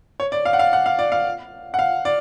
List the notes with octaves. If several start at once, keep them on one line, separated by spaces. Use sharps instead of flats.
C#5
D5
F5
F#5
F5
F#5
F5
D5
F5
F#5
F5
D5